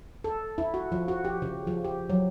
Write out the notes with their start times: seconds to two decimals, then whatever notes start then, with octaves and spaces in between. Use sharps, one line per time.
0.24 A4
0.58 E4
0.74 F#4
0.92 F3
1.08 F#4
1.25 G4
1.42 C#3
1.67 F3
1.85 G4
2.10 F#3